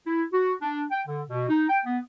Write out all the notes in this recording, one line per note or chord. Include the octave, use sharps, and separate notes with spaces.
E4
F#4
D4
G5
D3
B2
D#4
G5
B3